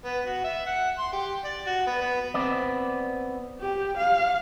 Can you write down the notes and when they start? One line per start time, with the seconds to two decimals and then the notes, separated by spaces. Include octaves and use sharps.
0.05 B3
0.25 F#4
0.44 E5
0.66 F#5
0.99 C6
1.13 G4
1.44 D5
1.66 F#4
1.87 B3
2.01 B3
2.34 B3 C4 D5
3.60 G4
3.98 F5